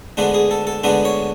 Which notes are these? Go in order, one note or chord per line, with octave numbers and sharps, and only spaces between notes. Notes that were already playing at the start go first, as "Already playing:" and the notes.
D2 D3 G#3 B3 D4 B4
G#4
A4
A4
D2 D3 G#3 B3 D4 B4
C#5